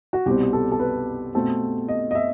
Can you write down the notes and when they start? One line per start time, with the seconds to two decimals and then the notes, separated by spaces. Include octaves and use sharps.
0.13 F#4
0.26 C2 B2 G3 C4 G4
0.53 A4
0.72 A4
0.80 B4
1.35 B2 A3 C4 A4
1.88 D#5
2.11 D#5
2.15 E5